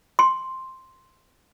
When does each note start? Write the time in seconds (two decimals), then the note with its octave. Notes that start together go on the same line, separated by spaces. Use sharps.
0.19 C6